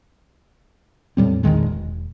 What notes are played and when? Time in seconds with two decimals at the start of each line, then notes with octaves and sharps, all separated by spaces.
1.17 E2 A2 G3 C4
1.44 A#1 E2 D#3 G#3
1.66 E1